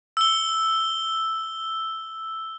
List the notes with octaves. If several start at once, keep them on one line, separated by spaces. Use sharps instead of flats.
E6 G7